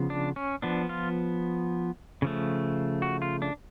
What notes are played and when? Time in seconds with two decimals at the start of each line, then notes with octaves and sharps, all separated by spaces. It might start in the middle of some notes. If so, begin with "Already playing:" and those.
Already playing: C#3 F3 B3
0.10 D4
0.36 C#4
0.62 F3 B3 D4
0.89 F4
2.22 C#3 F3 A3
3.02 F#4
3.22 F4
3.42 D4